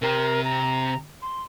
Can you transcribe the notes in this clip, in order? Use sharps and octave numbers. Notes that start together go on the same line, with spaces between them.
C3 G4 A#4
A#5
C6